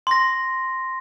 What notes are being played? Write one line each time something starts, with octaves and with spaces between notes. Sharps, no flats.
C6 A#6